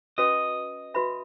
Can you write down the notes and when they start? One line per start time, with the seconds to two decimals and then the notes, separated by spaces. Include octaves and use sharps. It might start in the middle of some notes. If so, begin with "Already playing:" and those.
0.18 C#4 F#4 B4 D#5
0.94 F#4 B4 E5 B5